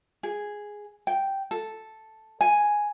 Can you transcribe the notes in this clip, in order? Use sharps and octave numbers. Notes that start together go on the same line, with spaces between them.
G#4
G5
A4
G#5